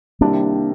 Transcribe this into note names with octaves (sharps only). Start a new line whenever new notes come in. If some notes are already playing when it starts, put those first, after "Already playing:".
C2 C3 D#3 A#3 D4